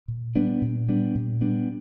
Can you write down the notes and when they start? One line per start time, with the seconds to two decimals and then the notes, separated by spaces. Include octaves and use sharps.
0.08 A#2
0.35 G3 B3 D4
0.61 A#2
0.88 G3 B3 D4
1.15 A#2
1.41 G3 B3 D4